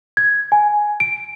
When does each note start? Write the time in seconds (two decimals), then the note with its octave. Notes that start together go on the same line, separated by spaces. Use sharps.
0.17 G#6
0.52 G#5
1.00 D7